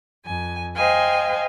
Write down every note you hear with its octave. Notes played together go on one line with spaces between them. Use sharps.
F2 G#5
C5 D#5 F5 G5 G#5